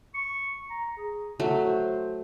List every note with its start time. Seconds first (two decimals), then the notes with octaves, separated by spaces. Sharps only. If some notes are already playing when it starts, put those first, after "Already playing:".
0.14 C#6
0.70 A#5
0.97 G#4
1.40 F#3 A3 F#4
1.66 C5